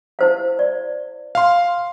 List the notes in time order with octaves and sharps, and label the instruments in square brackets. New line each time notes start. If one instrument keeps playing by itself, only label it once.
[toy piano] E4 C5 F5
D5
[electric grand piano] F5 C6